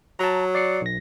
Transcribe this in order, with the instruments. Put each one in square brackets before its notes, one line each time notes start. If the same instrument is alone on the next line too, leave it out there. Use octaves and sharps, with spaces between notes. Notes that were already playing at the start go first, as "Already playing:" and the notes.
[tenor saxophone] F#3 [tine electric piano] A5 A#5
[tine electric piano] D5 C7 C#7
B1 A#6